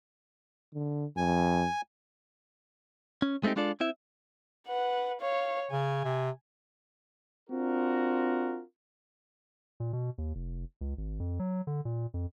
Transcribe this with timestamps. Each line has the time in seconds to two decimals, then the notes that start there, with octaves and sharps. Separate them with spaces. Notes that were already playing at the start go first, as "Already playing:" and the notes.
0.74 D3
1.17 F2 G#5
3.22 C#4
3.43 G#3 A3 C4 D#4 G4
3.56 G#3 D4 F4 A4 D5
3.80 C4 E4 E5
4.68 B4 F#5
5.21 C#5 F5
5.71 C#3 G#5
6.04 C3
7.50 C4 D4 F4 F#4 A#4
9.80 A#2
9.93 B2
10.18 D#2
10.35 F1
10.81 C#2
10.98 G#1
11.20 F2
11.39 F#3
11.67 D3
11.85 A#2
12.14 F2